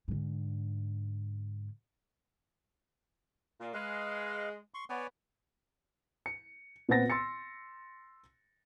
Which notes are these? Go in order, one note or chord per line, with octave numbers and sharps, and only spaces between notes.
G#2 D3
A#2
G#3 B4 F5
C6 C#6
B3 C#5 D5 G#5
C#7
A#2 B3 C4 F#5 A6 A#6
C6 E6 A6 C#7